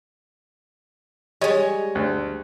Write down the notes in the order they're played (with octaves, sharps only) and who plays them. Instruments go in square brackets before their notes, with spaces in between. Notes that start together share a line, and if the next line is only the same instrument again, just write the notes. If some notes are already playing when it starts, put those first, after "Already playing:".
[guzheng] G3 G#3 [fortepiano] C#5 D#5
[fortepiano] D2